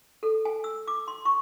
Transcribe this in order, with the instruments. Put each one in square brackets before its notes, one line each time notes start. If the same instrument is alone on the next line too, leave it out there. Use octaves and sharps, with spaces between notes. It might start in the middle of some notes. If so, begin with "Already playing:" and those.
[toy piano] A4
G#5
E6
D6
C6
C#6